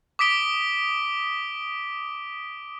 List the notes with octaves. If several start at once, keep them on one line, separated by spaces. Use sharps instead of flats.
D6 D#6 B6 D7 G7